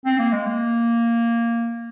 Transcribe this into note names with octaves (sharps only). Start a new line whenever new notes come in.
C4
A#3
G#3
A#3